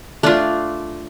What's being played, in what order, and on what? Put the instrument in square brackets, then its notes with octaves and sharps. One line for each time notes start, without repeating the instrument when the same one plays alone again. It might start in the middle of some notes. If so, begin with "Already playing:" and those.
[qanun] A3 D4 F4